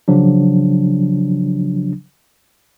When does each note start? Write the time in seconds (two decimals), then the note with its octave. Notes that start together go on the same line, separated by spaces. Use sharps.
0.08 C#3 F3 F#3 D4